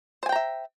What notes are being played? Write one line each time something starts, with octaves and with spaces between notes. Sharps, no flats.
C5 E5 G5 G#5 A#5